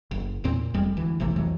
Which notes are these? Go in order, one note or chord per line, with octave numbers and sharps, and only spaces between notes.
F#1
E2 A#2 C4
F1 F2 G3 G#3
D2 E3
G#1 C3 E3 A3
C2 F2 E3 F#3